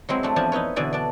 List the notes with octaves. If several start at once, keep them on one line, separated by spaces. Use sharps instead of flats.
F#3 G#3 C4 E4
A3 D4
E2 F3 D4 G#5 A5
D#4 E4 B4 C#5
B2 D3 E3 D5 G#5
D4 D5